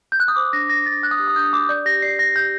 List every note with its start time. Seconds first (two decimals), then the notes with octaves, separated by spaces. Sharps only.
0.12 G6
0.20 F#6
0.28 D#6
0.36 C5 D6
0.53 D4 A#6
0.69 D4 A#6
0.86 D4 A6
1.03 D4 F#6
1.11 D#6
1.19 G4
1.28 D#6
1.36 D4 G6
1.53 D4 D6
1.69 D5 G6
1.85 G4 A#6
2.02 D5 C7
2.19 D5 A#6
2.36 G4 G6